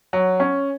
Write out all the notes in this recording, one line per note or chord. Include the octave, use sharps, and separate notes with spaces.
F#3
C#4